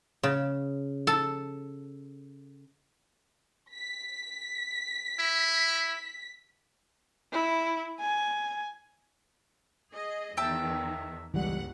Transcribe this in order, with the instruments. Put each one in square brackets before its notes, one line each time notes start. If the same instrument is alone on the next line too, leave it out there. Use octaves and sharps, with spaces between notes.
[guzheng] C#3
A4
[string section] B6
[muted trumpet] E4
[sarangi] E4
G#5
[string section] G#4 D#5
[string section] E2 D#3 [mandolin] E5 G5 A5
[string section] G1 C#2 F#5 [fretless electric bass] E3 G3